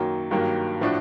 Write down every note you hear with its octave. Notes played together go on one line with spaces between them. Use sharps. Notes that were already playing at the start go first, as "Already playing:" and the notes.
Already playing: F#2 D#3 F#3 A#3
G2 D#3 F#3 A#3
A2 F3 A3 D4 F#4